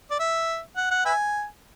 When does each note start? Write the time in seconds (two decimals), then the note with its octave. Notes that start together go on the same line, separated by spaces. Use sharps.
0.11 D5
0.20 E5
0.76 F#5
0.91 F#5
1.05 B4 E5 G#5